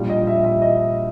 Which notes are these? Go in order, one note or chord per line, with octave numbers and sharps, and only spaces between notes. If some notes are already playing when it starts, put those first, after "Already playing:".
Already playing: A#1 A#2 G3
D#5
E5
E5
D#5